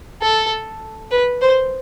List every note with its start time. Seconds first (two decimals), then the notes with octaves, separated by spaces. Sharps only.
0.22 A4
1.11 B4
1.41 C5